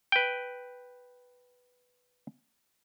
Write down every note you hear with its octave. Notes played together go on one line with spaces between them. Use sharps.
B4 G5